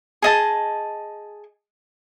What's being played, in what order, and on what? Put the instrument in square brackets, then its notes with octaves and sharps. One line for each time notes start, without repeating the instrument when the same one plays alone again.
[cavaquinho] G#4 D#5 A5